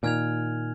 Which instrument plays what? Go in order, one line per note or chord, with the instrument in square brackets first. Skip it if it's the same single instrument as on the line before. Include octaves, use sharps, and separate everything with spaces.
[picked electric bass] A#2 D#3 [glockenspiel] G#5 F6 G#6 F7